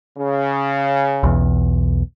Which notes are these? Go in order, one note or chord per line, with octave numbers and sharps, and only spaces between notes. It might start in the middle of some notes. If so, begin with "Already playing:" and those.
C#3
B1 E2